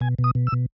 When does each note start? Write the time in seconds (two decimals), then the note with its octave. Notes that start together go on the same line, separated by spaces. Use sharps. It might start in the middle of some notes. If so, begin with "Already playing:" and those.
0.01 B2 G#5
0.19 B2
0.24 D#6
0.35 B2
0.47 E6
0.52 B2